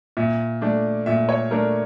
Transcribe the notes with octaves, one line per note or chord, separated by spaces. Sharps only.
A#2 E5
A3 D4
A#2 E5
C#5
A3 D4 A#4